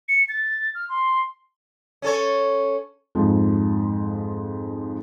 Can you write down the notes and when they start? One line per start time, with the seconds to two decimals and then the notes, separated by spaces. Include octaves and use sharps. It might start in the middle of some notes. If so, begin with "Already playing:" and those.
0.09 C#7
0.29 A6
0.75 F6
0.89 C6
2.02 C#4 A4 C#5
3.15 F2 G#2 F3